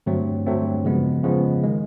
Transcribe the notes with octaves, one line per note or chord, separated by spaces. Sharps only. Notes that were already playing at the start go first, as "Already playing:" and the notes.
G2 D3 F#3 A3 C4
G2 D3 F#3 A3 C4
C#3 F3 G#3 B3
C#3 F3 G#3 B3
D#3 G#3